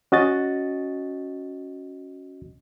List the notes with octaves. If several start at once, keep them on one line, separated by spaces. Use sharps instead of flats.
C#4 F#4 D#5 A6